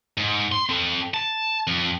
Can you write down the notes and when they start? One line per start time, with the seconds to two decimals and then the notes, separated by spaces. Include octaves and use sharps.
0.17 G#2
0.52 C6
0.69 C4 A4
1.14 A5
1.67 F2